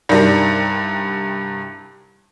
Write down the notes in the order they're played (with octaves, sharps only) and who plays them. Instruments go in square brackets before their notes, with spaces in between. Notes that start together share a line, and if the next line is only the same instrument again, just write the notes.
[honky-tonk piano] C2 G2 [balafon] D#4 A#4 D5